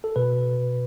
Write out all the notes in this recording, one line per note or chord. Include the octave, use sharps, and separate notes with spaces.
A4
B2 B4